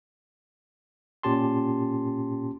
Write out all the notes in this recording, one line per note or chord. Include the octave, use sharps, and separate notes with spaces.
A#2 C#4 G4 A5 C6